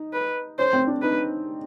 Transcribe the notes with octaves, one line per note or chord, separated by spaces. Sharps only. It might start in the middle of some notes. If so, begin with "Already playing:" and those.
Already playing: D#4
B4
C#4 C5
C4
D4
D#4 B4